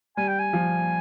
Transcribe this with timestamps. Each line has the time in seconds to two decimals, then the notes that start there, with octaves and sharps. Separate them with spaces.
0.17 G3 G#5
0.28 G5
0.40 G#5
0.53 F3